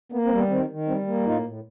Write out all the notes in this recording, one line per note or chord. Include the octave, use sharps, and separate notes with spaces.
A#3 B3
C4
G3
B3
D#3 C4
D#3
G3 C4
A#3
A2 D#4 F4
A2